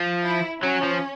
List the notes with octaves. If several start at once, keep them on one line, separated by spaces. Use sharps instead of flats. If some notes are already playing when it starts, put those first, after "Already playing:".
Already playing: F3
E4
F#3 C#4
F3